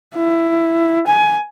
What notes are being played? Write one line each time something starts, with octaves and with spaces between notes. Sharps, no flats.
E4
G#5